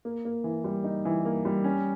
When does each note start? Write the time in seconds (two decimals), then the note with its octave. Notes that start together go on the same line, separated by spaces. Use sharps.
0.05 A#3
0.25 A#3
0.44 E3
0.64 G3
0.84 D#4
1.05 E3
1.25 A#3
1.45 G3
1.64 C#4